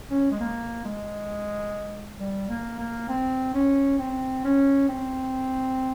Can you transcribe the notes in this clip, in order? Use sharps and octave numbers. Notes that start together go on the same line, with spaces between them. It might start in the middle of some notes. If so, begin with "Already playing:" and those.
C#4
G#3
A#3
G#3
G3
A#3
A#3
C4
C#4
C4
C#4
C4